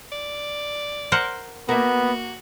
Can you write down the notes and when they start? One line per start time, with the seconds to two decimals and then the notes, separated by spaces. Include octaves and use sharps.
0.12 D5
1.12 A#4 C5 F#5
1.69 A#3 B3 F#4 E5